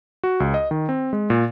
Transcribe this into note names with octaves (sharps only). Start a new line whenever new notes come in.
F#4
C#2
D#5
D#3
C4
G#3
A#2